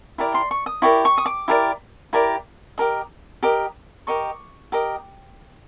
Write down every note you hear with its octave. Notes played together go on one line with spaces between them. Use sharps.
E4 G4 A#4 D5
C6
C#6
D#6
E4 G4 A#4 D5 C#6
C#6
D#6
D6
E4 G4 A#4 D5
E4 G4 A#4 D5
G4 A#4 D#5
G4 A#4 D#5
G4 A#4 D#5 C#6
G4 A#4 D#5